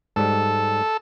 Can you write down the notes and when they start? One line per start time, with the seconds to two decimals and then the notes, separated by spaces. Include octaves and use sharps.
0.16 G#2 G3 A4